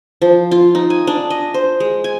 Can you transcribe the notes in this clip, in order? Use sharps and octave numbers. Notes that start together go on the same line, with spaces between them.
F3
F4
D#4
G#5
D4
D#5
C5
G#3
G#5